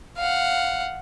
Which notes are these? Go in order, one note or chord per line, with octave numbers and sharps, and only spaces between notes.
F5 F#5